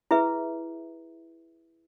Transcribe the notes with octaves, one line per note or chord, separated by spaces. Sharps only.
E4 G#4 B4 E5